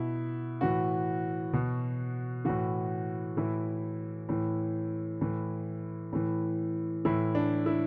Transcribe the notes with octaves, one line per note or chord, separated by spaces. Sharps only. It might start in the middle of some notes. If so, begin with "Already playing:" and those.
Already playing: B2 E4
A2 E3 F#4
B2
A2 E3 F#4
A2 E3 E4
A2 E3
A2 E3
A2 E3
A2 E3 E4
D4
E4